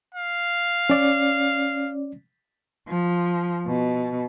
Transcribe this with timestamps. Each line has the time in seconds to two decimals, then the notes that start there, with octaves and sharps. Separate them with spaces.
0.15 F5
0.90 C#4 D5
2.88 F3
3.67 B2